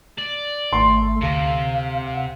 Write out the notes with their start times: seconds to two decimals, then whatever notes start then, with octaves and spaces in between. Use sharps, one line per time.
0.18 D5
0.73 G#1 A3 C6
1.21 D2 C3 A4 F5
2.13 F#5